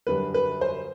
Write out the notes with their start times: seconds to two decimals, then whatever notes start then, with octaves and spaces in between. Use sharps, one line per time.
0.07 F#2 D3 G3 B4
0.34 B4
0.61 C5